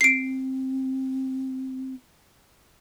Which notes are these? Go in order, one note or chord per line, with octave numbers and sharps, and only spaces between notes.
C4 C7 D7